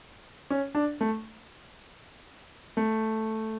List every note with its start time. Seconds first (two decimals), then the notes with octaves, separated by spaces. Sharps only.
0.50 C#4
0.75 D4
1.01 A3
2.77 A3